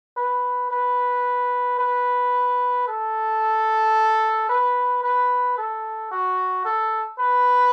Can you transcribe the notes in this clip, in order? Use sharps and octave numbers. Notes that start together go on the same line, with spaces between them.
B4
B4
B4
A4
B4
B4
A4
F#4
A4
B4